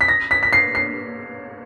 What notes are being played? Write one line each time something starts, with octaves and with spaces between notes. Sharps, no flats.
B6
A#6
B6
B6
C7
C7